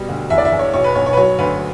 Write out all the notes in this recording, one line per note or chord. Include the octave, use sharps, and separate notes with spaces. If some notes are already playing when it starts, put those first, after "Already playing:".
Already playing: B2 G3
D2
E2 E5
D5
E5
E2
C#5
B1 C#5
B4
B1 C#5
C#5
B4
F#3 C#5
D2 B4